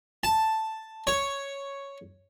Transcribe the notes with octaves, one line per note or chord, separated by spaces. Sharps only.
A5
C#5